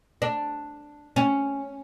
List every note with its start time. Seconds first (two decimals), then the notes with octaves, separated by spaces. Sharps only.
0.22 D4
1.16 C#4